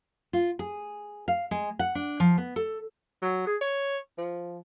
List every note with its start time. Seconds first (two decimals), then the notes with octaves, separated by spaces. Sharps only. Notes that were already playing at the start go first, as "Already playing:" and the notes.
0.33 F4
0.59 G#4
1.28 F5
1.51 G#3
1.79 F#5
1.95 D4
2.20 F3
2.38 B3
2.56 A4
3.22 F#3
3.47 G#4
3.61 C#5
4.18 F3